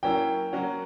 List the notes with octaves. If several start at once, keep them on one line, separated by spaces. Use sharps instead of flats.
F#3 A#3 C#4 E4 G5
F#3 A#3 C#4 F#4